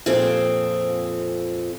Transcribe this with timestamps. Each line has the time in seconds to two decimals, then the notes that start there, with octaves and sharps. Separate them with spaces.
0.06 F2 A#2 C4 G#4 A4